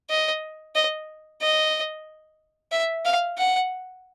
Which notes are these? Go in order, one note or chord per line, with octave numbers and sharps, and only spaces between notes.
D#5
D#5
D#5
E5
F5
F#5